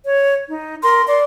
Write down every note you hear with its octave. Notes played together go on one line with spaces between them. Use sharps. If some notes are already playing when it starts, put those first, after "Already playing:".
C#5
D#4
A#4 C6
D5 C6